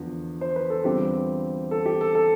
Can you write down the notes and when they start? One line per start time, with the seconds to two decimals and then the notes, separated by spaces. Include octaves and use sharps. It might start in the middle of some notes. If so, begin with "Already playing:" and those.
Already playing: E2 D3 F3
0.41 C5
0.56 B4
0.70 A4
0.84 E2 D3 G3 C4 F4 G4
1.71 A4
1.86 G4
2.01 A4
2.15 A4